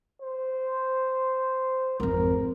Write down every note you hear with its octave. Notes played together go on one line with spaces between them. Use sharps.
C5
G#1 F2 A#4